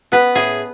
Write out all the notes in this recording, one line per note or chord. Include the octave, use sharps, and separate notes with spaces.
B3 B4
A2 G#4